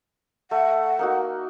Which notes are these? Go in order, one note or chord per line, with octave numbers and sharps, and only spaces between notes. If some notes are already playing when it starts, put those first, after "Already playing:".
A3 F#5
A#3 D#4 F#4